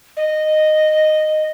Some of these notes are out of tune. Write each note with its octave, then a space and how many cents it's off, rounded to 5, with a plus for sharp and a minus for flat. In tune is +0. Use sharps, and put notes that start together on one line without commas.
D#5 -10